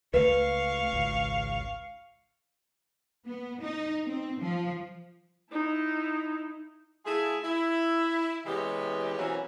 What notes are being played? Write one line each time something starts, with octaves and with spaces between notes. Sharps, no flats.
C#2 A3 B4 F5 C#6
G#1 C#2
B3
D#4
C4
F3
D#4 E4
A3 E4 F4 G#4
E4
C3 E3 G#3 B3 C#4 G4
B2 E3 F#3 A#3 C4 C#4